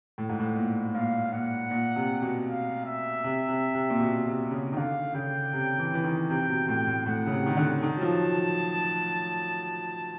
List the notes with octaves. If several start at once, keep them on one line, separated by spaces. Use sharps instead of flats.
A2
G#2
A2
A#2
A#2 F5
A#2 F#5
A#2
C3
B2
F5
E5
C3
C3
C3
A#2
B2
C3
C#3
D#3
D3 F5
C#3 G5
C3
E3
E3
D#3
C3 G5
C3
B2
A2 G5
A2
A2 F#5
C#3
C3
D#3
D3
D#3 A5
F#3
F3